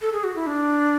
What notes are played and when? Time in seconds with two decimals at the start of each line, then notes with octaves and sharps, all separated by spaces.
0.02 A4
0.13 G#4
0.24 F#4
0.35 E4
0.47 D4